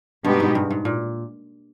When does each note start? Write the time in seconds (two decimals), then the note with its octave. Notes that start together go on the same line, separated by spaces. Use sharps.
0.24 G2 B2 G#3 B3 D#4 G4
0.40 G#2
0.55 G2
0.71 G#2
0.85 A#2